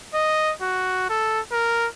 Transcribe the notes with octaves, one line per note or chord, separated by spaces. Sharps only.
D#5
F#4
A4
A#4